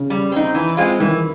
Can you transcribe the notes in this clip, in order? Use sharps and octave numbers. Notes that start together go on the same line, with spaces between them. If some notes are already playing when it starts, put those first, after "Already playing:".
Already playing: C#3
G3
C4 D#4
E3
G#3 C4 F4
D#3 E3